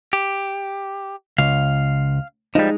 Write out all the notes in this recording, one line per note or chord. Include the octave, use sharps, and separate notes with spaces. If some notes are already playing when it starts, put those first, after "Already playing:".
G4
C#2 F5
F3 G3 G#3 D#4